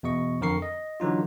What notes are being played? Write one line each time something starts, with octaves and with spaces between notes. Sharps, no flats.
E2 B2 D#5 C#6
F2 D3 A#4 C#6 C7
D#5
D3 E3 F#3 D#4 F4